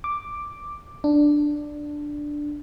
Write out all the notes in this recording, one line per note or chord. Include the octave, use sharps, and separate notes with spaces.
D6
D4